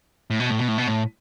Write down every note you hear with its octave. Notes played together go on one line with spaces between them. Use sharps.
A2
B2
A2
B2
A2
B2
A2